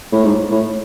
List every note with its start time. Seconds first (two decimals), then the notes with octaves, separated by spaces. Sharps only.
0.12 A2
0.24 G#2
0.51 A2